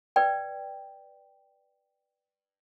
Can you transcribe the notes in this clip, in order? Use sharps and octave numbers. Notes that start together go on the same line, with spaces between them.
B4 D5 G5